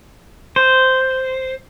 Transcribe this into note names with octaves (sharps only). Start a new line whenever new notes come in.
C5